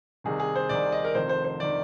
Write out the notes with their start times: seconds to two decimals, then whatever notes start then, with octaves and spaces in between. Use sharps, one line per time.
0.24 C2 C3 D#3 G#4
0.40 G#4
0.55 C5
0.69 C2 C3 D#3 D5
0.92 D#5
1.05 A#4
1.15 F1 F2 D#3 C5
1.29 C5
1.44 C5
1.60 D#3 D5